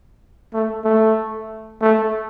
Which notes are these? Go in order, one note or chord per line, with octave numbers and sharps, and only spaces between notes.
A3
A3
A3